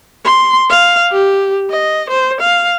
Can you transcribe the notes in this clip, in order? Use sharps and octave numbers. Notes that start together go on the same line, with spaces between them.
C6
F5
G4
D#5
C5
F5